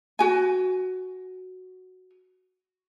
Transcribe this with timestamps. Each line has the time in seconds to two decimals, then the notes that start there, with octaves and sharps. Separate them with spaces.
0.19 F#4 G#5